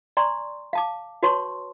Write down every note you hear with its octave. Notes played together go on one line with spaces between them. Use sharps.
D5 G#5 A#5 C6 C#6
F5 A5 D6
F#4 B4 C#5 A5 C6 C#6